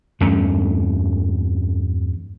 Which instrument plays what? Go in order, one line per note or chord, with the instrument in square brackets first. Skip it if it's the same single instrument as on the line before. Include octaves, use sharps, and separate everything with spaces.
[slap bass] E2 G2 A3 C#4